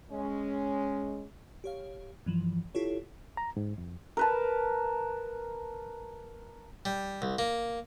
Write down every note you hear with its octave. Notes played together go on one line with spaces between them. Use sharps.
G#3 C#4
G4 C#5 F5
G2 E3 F3
E4 F4 G4 A4 C#5
A#5
G#2
F2
A#4 B4 A5
G3
C2
A#3